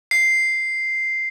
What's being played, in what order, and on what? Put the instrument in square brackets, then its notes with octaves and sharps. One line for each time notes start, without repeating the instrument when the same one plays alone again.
[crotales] C7